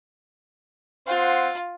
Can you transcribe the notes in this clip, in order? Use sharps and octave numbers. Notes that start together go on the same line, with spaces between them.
C4 F4 C5 F#5